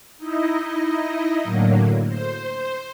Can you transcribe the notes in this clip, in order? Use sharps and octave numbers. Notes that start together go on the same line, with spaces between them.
D#4 E4 D#5
A2 D3 F#3 A#3
C5